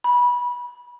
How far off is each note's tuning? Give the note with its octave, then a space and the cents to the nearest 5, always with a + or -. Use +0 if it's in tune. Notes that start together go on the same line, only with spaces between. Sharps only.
B5 -20